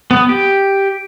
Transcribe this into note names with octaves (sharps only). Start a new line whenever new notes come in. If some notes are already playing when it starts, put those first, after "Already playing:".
B3
G4